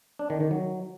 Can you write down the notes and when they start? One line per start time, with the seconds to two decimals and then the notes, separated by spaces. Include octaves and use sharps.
0.19 D4
0.30 D#3
0.40 D#3
0.51 F#3